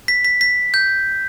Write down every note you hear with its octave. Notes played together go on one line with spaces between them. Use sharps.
B6
B6
B6
G6